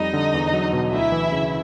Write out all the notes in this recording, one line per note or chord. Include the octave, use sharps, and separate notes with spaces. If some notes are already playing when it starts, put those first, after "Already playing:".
Already playing: F2 G3 D#4 D#5
D3
E2
F#3
B2
D2 E4 E5
E3
C#3